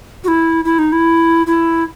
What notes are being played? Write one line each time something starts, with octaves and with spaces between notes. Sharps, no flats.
F#4
E4
E4
D#4
E4
E4